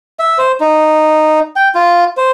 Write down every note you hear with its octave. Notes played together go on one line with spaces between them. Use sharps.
E5
C5
D#4
G5
F4
C5